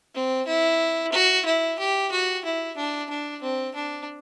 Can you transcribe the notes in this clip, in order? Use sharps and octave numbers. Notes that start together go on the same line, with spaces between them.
C4
E4
F#4
E4
G4
F#4
E4
D4
D4
C4
D4